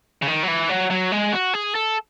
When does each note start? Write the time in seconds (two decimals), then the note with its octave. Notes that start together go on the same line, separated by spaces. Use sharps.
0.22 C#3
0.27 D#3
0.43 F#3
0.48 E3
0.69 F#3
0.91 F#3
1.12 G#3
1.33 F#4
1.54 G#4
1.75 A4